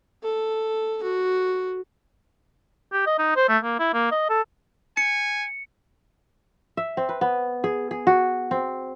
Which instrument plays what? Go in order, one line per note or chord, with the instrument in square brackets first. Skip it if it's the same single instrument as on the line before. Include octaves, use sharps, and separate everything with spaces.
[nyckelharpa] A4
F#4
[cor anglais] G4
D#5
D#4
C5
A3
A#3
E4
A#3
D#5
A4
[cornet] G#5 [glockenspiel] C#7
[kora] E5
C4
B4
B3
G#4
G#4
F#4
C4